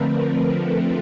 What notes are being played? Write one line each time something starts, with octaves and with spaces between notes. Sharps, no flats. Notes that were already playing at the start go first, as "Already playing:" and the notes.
Already playing: D3 F3 A3 C4 A#4 B4
B4
A4